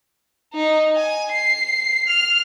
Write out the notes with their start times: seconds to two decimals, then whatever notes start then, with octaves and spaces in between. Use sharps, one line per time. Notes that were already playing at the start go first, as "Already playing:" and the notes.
0.54 D#4
0.96 G#5
1.32 C7
2.08 F6